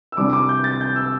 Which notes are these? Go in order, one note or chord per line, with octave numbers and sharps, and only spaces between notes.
E6
C2 C3 G3 D4 D6
D6
G6
A6
G6
E6